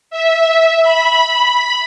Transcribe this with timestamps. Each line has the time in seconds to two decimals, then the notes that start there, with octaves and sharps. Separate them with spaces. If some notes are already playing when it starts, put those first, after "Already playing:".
0.11 E5
0.83 B5